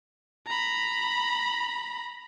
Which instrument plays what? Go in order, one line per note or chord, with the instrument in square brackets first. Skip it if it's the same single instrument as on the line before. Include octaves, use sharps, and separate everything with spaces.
[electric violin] A#5 B5